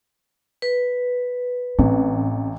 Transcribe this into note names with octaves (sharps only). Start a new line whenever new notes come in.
B4
A1 C4